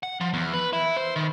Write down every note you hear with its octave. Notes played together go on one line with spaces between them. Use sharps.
F#5
F3
E2
B4
E4
C5
D#3